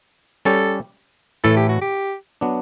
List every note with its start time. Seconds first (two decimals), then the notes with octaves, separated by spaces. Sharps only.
0.45 G3 C#4 G4 A4
1.44 A2 E3 A3 E4 A4
1.57 G4
1.69 F#4
1.82 G4
2.41 F#3 B3 D4